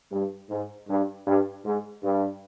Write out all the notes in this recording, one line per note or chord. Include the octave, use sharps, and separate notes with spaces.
G2
G#2
G2
G2
G#2
G2